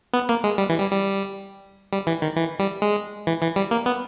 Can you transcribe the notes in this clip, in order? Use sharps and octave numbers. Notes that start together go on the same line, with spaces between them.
B3
A#3
G#3
G3
E3
G3
G3
G3
E3
D#3
E3
G3
G#3
E3
E3
G3
A#3
B3